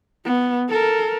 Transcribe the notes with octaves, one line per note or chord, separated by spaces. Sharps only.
B3
A4 A#4